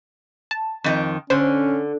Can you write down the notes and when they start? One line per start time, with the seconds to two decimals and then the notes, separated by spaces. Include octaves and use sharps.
0.51 A5
0.84 F2 D#3
1.30 D3 C#4 C5